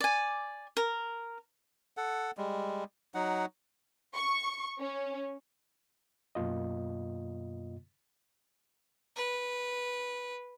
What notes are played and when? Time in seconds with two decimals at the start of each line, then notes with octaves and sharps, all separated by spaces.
0.01 D5 G#5
0.77 A#4
1.97 A4 F#5
2.37 G3 G#3
3.14 F#3 D#4 F#5
4.15 C#6
4.81 C#4
6.35 F#2 B2 A#3 F4 D#5
9.16 B4